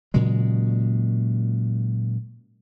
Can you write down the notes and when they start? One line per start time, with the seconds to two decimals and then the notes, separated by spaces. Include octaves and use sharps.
0.14 A#2 C#3 F#3 G#3